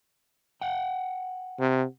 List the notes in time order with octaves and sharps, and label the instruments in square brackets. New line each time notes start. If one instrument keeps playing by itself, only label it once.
[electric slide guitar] F#5 G5
[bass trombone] C3